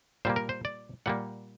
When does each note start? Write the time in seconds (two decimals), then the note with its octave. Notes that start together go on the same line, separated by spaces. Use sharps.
0.25 A#2 G3 A#3 C5
0.36 A#4
0.49 C5
0.65 D5
1.06 A#2 G3 A#3 F#5